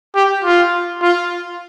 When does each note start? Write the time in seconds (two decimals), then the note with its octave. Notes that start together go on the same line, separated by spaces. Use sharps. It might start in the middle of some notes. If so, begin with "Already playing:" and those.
0.15 G4
0.44 F4
1.02 F4